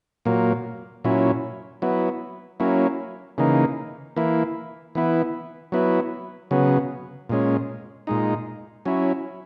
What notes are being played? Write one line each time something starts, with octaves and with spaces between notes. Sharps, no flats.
A#2 F#3 A#3
A#2 F#3 C#4 E4
F#3 B3 E4
F#3 A#3 C#4 E4
C#3 E3 A#3 D#4
E3 A#3 E4
E3 B3 E4
F#3 B3 E4
C#3 F#3 B3
A#2 G#3 C#4
A#2 G#3 D#4
F#3 C#4 E4